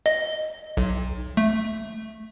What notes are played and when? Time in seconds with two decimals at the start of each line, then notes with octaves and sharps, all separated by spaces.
0.06 D#5
0.77 B1
1.37 A3